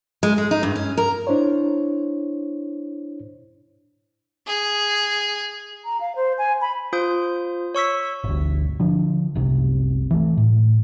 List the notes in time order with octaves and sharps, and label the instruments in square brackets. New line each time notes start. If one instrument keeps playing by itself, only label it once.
[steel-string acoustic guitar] G#3
G#3
D#4
G2
C#4
A#4
[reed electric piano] D4 E4 C5 C#5
[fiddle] G#4
[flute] A#5
F5
C5
G#5
B5
[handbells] F4 C5 D#6 G6
C#5 C#6 E6 B6
[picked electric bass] G1 D2
D3 F3 D4
F#1 C2 C3
E3 A3
A2